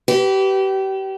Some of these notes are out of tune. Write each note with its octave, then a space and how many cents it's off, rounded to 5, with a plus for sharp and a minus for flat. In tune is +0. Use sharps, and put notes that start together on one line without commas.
G4 -30 B4 +0